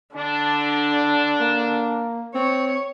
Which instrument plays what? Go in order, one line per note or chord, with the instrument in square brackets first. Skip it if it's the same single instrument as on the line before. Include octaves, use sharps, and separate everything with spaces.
[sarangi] D3 [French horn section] D4
[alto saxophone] A#3
[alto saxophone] C4 [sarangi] C#5